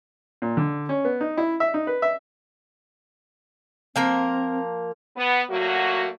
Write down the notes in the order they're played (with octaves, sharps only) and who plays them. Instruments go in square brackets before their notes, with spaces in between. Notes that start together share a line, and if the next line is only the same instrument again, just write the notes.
[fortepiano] A#2
D3
C#4
B3
D#4
E4
E5
D#4
B4
E5
[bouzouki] F3 A#3 A#4 [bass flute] C4
[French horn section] B3
A#2 F#3 A3 A#3 F#4